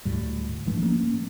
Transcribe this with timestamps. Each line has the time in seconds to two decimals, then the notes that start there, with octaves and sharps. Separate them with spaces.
0.05 D2 A2 G3
0.67 G2 F3 A3
0.83 A#3 C#4